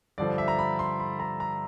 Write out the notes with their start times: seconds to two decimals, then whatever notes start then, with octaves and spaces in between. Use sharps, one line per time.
0.18 G2 D3 F3 D5
0.38 E5
0.48 A#5
0.59 B5
0.79 C6
1.00 B5
1.19 A#5
1.40 A#5